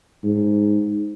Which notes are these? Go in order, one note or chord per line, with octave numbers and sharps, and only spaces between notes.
G#2